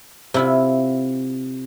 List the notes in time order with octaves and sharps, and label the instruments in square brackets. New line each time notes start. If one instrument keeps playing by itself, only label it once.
[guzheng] C3 E4 F4